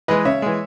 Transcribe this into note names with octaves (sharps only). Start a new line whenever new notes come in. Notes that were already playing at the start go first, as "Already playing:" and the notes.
E3 G#3 B4 D#5
C#3 C#5 E5
E3 G#3